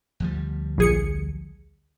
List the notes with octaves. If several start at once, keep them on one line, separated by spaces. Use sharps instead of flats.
D2 F3 G3
A#1 G#4 C#7